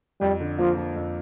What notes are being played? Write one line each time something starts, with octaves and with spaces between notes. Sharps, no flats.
F2 G3
D3
F3 A#3
F3
F2